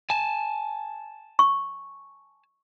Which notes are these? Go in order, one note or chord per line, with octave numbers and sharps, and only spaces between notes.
G#5 A5
C#6